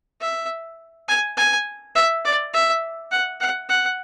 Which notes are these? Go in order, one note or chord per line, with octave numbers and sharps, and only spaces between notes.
E5
G#5
G#5
E5
D5
E5
F#5
F#5
F#5